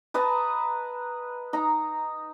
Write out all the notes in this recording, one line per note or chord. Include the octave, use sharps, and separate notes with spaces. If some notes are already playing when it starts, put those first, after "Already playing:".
B4 D#5 A5 A#5
D#4 A#5